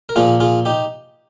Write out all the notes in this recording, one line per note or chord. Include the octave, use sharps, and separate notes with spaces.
A#4
A#2 F3 A#3 F4 G#4
F4 G#4
D#4 G4